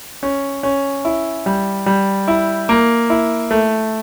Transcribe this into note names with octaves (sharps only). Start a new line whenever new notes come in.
C#4
C#4
E4
G3
G3
E4
A#3
E4
A3